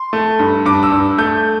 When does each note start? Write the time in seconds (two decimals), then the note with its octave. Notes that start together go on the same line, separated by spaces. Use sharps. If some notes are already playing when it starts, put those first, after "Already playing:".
Already playing: C6
0.13 A3
0.39 G2
0.65 G2 D6
0.83 E6
0.92 G2
1.18 A3 G6